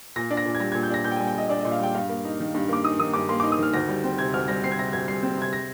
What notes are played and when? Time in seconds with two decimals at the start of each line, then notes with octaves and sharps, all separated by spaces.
0.16 A#2 A#6
0.31 D4
0.37 A#6
0.45 A#2
0.55 G#6
0.60 G3 A#6
0.72 A#2 G#6
0.83 G6
0.90 D4 A#6
1.04 A#2 G6
1.12 G5
1.16 G3 G#5
1.27 G5
1.35 A#2 D#5
1.49 D4 D5
1.61 A#2 D#5
1.72 F5
1.80 G3 G5
1.94 G2 F5
2.09 A#3
2.25 D#4
2.40 D#3
2.55 G2
2.69 A#3 D6
2.84 D#4 D#6
2.99 D#3 D#6
3.14 G2 D6
3.29 A#3 C6
3.40 D#4 D6
3.52 D#6
3.58 D#3 F6
3.73 D2 A#6
3.89 G3
4.04 C4
4.19 C3 G#6
4.34 D2 F6
4.48 G3 A#6
4.63 C4 C7
4.72 G#6
4.78 C3 A#6
4.93 D2 G#6
5.08 G3 C7
5.23 C4
5.38 C3 G#6
5.53 A#6